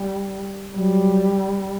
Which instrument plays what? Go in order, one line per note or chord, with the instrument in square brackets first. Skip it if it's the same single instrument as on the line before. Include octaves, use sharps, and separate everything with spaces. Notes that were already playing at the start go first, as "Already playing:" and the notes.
Already playing: [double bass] G3
[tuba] F#3 [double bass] G3